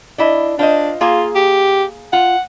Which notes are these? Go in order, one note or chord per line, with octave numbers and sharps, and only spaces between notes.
D4 E4 D#5
D4 F4 C5 D#5
A#3 F4 G#4
G4
F4 F#5